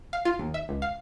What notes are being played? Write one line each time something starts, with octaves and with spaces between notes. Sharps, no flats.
F5
F4
D#2
E5
C#2
F5